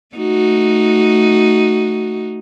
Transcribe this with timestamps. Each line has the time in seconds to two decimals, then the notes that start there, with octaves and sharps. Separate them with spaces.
0.16 A3 D#4 F#4